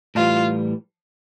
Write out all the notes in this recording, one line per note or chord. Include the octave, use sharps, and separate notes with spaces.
A2 E3 G3 F4